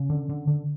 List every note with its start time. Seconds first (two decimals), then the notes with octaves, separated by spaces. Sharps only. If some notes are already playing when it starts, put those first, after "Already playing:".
Already playing: C#3 C#4
0.10 D3
0.29 D3
0.47 D3